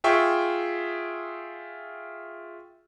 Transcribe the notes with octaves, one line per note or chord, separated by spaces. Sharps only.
F4 G#4 E5 G5 C#6